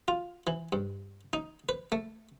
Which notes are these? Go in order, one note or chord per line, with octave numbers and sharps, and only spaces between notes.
F4
E3
G2
D#4
B4
A3